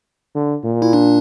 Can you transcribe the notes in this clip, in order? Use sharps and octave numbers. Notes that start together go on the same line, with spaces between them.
D3
A#2
E4
D4